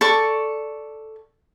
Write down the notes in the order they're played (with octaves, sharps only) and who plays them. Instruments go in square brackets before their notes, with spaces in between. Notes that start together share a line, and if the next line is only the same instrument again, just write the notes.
[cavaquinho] A4 D5 C#6